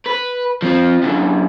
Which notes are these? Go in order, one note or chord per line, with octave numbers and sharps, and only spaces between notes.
B4
F3 C4
F#2 D3